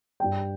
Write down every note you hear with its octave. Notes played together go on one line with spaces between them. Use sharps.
G2 G3 G5